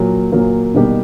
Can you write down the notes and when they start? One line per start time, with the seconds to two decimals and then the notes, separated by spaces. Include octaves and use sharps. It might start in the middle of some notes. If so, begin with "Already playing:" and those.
Already playing: A#2 F#3 A#3
0.32 A#2 F#3 A#3
0.74 B2 G3 A#3 D#4 G4